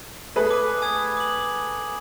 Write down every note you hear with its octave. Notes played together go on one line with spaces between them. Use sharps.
A3 G#4 B4
D6
G#5 D#6 G#6
D6 F#7